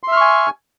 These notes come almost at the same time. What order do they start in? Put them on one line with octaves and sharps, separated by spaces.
C6 E5 F6 C#6 G#5